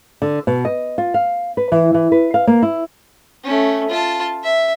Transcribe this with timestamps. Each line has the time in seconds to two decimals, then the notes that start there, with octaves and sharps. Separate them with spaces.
0.22 D3
0.47 B2
0.65 D#5
0.98 F4
1.14 F5
1.57 B4
1.72 E3
1.94 E3
2.12 B4
2.34 F5
2.47 A#3
2.63 E4
3.44 A3 C#4
3.89 F4 A5
4.43 E5